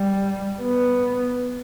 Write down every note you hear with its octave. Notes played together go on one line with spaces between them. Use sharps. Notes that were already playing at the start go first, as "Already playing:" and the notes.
Already playing: G3
B3